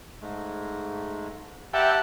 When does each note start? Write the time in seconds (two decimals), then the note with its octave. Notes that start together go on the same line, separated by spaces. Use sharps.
0.21 G#2 G#3 A3
1.74 G4 B4 D5 E5 F#5 G5 A5 A#5